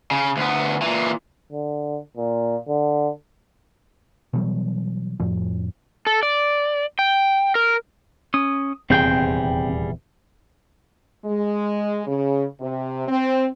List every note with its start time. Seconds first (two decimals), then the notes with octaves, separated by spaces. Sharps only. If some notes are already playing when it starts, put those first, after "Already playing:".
0.11 C#3
0.37 D2 B3
0.82 A#2 E3
1.52 D3
2.17 A#2
2.68 D3
4.33 B2 E3 F#3 G3
5.20 F2 A2 F3
6.07 A4
6.23 D5
6.99 G5
7.55 A#4
8.34 C#4 D#6
8.90 D#1 E2 C3 G3 C4 G#4 G5 G6
11.25 G#3
12.06 C#3
12.61 C3
13.08 C4